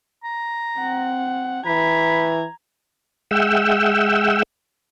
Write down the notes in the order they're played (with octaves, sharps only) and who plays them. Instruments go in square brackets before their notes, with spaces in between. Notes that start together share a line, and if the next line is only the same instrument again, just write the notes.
[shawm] A#5
[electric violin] C4 F#5
[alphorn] E3 [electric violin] A#5 G#6 [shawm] B5
[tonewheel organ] G#3 E5 F#5 G5 E6